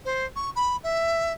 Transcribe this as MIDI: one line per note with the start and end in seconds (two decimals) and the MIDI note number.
0.05 0.25 72
0.36 0.50 85
0.55 0.76 83
0.83 1.33 76